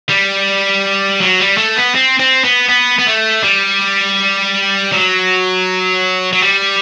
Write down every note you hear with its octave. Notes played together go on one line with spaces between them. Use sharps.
G3
F#3
G3
A3
B3
C4
C4
B3
B3
B3
A3
G3
F#3
F#3
G3